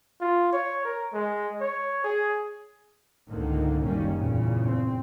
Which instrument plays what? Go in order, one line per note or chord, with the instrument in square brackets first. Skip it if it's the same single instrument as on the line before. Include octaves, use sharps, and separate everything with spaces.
[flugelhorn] F4
C#5
A#4
G#3
C#5
G#4
[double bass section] C#2 G#2 D3 D#3 A#3
F#1 D#3 G3 A#3 C#4
E2 G2 A#2 C#3
C4